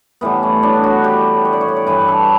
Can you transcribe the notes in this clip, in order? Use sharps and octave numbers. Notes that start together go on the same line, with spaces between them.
A2 E3 G3 B3
C#4
D4
F#4
G4
C#5
D5
C#5
D5
C#5
G2 E3 G3 B4
A4